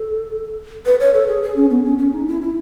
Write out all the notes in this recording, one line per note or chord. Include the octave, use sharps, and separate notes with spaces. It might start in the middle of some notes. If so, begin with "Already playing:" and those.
Already playing: A4
B4
C#5
A4
G#4
G#4
C#4
B3
C#4
C#4
D#4
E4
E4